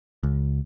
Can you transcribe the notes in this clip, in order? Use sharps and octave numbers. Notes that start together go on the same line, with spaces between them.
C#2